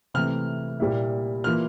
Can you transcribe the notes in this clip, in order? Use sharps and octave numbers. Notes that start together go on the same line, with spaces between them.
C3 E3 A3 F6
A#2 G3 A#3 E4
E3 A#3 F4 F6